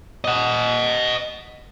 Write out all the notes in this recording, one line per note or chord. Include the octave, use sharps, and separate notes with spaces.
D#5 F#5